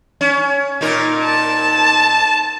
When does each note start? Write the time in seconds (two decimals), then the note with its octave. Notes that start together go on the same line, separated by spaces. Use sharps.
0.21 C#4
0.81 A#2 D#4 A#4
1.26 A5